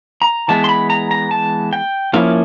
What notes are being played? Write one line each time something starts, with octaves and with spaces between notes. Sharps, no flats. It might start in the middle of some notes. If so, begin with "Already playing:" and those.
A#5
E3 G#3 B3 A5
C6
B5
A#5
A#5
A5
G5
F3 A#3 C#4 E4 F5